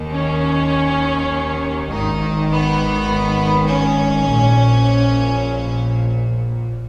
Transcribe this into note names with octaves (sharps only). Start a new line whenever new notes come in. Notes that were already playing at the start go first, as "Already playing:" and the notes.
Already playing: D#2 D#3
C#4
G#1 G#2 D#3 D#4
B3
C#4
A#1 A#2